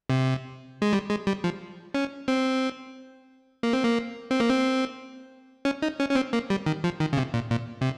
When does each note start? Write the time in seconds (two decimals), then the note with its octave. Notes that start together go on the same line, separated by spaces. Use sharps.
0.10 C3
0.82 G#3
0.93 G3
1.10 G#3
1.27 G3
1.44 F3
1.94 C#4
2.28 C4
3.63 A#3
3.73 C4
3.84 A#3
4.31 C4
4.40 A#3
4.49 C4
5.65 C#4
5.82 D#4
6.00 C#4
6.11 C#4
6.15 C4
6.33 A#3
6.50 G3
6.66 D#3
6.84 F3
7.00 D#3
7.13 C#3
7.17 C3
7.34 A#2
7.51 A#2
7.81 C3